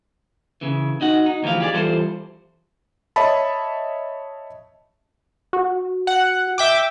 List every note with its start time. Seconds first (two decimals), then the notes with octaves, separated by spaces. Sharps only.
0.61 C#3 E3
1.01 D#4 F#4 F#5
1.26 D#4
1.43 D2 E3 F3 G4 F5
1.60 G4 G#4 D5
1.73 E3 G3 F4 A4 C5
3.16 C#5 D#5 E5 A5 B5
5.53 F#4
6.07 F#5
6.58 E5 G5 D6